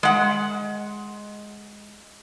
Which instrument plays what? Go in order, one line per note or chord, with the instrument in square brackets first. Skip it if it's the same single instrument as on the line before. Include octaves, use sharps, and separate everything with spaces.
[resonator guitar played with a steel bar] G#3 F#5